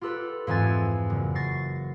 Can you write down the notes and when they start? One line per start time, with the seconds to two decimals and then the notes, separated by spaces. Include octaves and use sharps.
0.01 F4 G4 A4 B4
0.47 F2 G#2 E3 G#5 A6
1.10 F#1
1.35 C#6 A6 A#6 C7